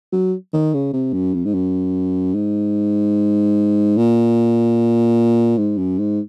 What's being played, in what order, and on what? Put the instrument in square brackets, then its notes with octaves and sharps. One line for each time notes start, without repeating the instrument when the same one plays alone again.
[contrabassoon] F#3
D#3
C#3
C3
F#2
F2
G#2
F#2
G#2
A#2
G#2
F#2
G#2